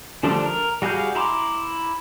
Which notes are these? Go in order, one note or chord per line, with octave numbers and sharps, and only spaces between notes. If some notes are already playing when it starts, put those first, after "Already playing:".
D3 F3 G3 A3 D4
A#4
G3 F#4 G#4 F5 G6
E4 A#5 C6 D6